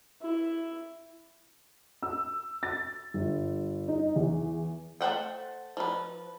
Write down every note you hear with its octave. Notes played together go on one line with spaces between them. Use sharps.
E4
E6
A6
G1
D#4
E2
A3 C5 F#5 G5
F3 B4